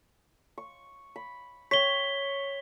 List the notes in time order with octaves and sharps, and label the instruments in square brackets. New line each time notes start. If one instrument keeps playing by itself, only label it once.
[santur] C#6
B5
[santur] C#5 G5 [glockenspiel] B6 G7